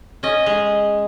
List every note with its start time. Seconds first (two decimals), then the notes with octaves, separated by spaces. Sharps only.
0.23 C#4 D#5
0.46 G#3